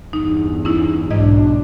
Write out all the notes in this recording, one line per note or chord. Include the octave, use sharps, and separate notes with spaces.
G1 E2 D#4
C#4 D#4 E4
B1 G#2 D4 D#5